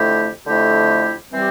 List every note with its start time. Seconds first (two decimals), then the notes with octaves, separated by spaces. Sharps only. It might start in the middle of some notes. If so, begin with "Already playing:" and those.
Already playing: F2 D3 A3 E4 G4
0.46 F2 D3 A3 E4 G4
1.31 E3 G3 C4 G4